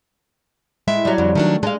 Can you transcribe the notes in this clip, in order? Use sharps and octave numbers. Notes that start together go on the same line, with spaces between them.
A2 G#3 E5
F#3 G3
F2 D3
D#3 F#3 A3 D4
G#3 D4 F5